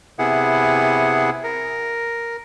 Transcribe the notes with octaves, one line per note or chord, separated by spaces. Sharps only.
C3 B3 E4 G#4 F#5
A#4